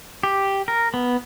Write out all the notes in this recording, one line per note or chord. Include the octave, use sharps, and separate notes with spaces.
G4
A#4
B3